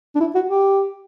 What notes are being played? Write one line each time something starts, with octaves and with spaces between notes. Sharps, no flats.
D4
E4
F#4
G4